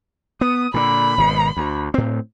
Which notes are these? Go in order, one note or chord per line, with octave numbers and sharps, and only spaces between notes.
B3 D#6
A#2 D3 B5
G#1 B2
D2
A2 C4